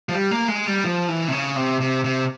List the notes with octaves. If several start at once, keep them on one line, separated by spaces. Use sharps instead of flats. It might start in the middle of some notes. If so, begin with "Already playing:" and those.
F3
G3
A#3
G#3
G3
F3
E3
C3
C#3
C3
C3
C3